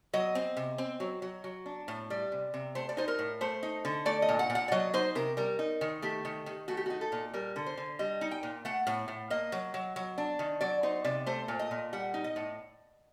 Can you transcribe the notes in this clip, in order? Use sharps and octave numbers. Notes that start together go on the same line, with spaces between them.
F#3 D#5
C4
C3
C4
F#3
F#3
F#3
D4
A2
G3 D5
C3
C3
A3 C5
D5
D#4 C5
A#4
A2
A3 C5
D#4
D3
A3 D5
D#5
A#2
F#5
A#2
F#5
D5
F#3 D#5
D#4 C5
C3 A#4
G3 A#4
D#4
D#3
A3 G4
D#3
D#3
A3 F#4
G4
D#4 F#4
A4
A#2
G3 A#4
D3
C5
D3
G3 D#5
D#4
G5
A#2
A3 F#5
A2
A2
A#3 D#5
F#3
F#3
F#3
D4
D#3
F#3 D5
D#4 C5
C3 D5
A3 C5
A#2
D#5
A#2
G3 F#5
D#4
D#5
A2